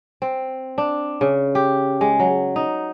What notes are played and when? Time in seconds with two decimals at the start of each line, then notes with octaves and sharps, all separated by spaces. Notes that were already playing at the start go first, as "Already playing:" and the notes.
0.22 C4
0.78 D4
1.21 C#3
1.55 G4
2.01 G#3
2.19 F#3
2.56 D#4